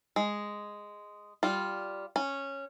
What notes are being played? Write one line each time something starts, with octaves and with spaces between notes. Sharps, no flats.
G#3
G3 F4
C#4